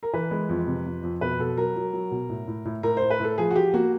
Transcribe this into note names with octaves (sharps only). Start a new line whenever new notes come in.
A#4
E3 B4
G#3
F2
C3
F2
F2
B2 B4
B2 A4
F#3 A#4
F#3
F#3
B2
A2
A2
A2
A2 A#4
A2 C5
B4
A2 A4
F3 G#4
F#4
F3 G4
A#3 F#4